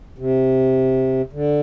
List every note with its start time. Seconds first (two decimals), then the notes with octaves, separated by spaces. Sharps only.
0.18 C3
1.33 D3